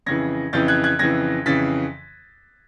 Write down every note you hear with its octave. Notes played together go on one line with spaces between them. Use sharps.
F2 C#3 E3 G#6 A#6
F2 C#3 E3 G6 A6
F#6 G#6
F#6 G#6
F2 C#3 E3 G#6 A#6
F2 C#3 E3 A6 B6